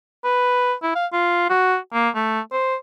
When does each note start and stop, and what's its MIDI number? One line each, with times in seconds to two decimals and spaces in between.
0.25 0.74 71
0.83 0.91 64
0.95 1.06 77
1.12 1.48 65
1.50 1.76 66
1.93 2.09 58
2.15 2.40 57
2.52 2.75 72